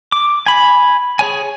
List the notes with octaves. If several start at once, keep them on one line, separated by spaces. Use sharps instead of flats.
D6
G#5 B5
G#4 C#5 G#5